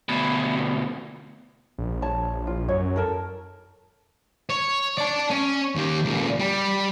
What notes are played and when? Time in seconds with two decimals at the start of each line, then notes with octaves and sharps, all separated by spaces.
0.09 D2 B2
1.78 A#1
2.02 C#5 A5
2.47 F4
2.68 F#2 C#5
2.96 A4 A#4 A5
4.50 C#5
4.98 D5 A5
5.31 C#4
5.75 D#2 G4
6.05 C#2 A#2
6.40 G3